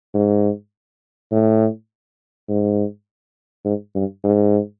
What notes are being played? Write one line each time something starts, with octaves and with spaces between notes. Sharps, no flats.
G#2
A2
G#2
G#2
G2
G#2